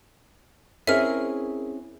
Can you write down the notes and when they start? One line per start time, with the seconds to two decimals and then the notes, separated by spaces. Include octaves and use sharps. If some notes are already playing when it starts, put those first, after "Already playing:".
0.87 C4 C#4 E4 G#4 A#4 D#5 E5 F6